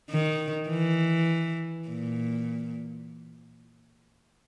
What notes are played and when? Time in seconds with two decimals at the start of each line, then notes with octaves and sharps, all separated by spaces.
0.10 D#3
0.69 E3
1.89 A#2